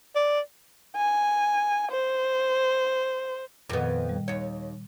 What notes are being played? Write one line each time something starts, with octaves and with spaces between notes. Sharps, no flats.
D5
G#5
C5
F2 A#2 D#3 B3
G3
D#2 C#5